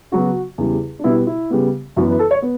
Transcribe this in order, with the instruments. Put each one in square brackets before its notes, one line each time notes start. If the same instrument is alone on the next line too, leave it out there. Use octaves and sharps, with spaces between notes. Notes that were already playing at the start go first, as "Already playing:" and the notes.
[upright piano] C#3 F#3 B3 F#4
E2 C#3 G3
D4
B2 G3 B3 E4
E4
C#3 G3 B3
F#2 E3 B3 F#4
B4
A4
C#5
B3